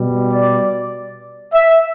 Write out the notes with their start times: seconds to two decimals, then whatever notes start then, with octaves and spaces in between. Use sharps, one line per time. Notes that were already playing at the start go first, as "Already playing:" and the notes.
Already playing: B2 G3
0.32 D5
1.53 E5